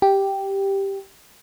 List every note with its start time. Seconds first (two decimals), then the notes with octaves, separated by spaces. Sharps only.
0.02 G4